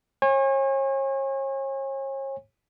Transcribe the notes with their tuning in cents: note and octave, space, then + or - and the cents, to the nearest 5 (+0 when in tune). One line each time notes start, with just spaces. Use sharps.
C#5 -35 G#5 -30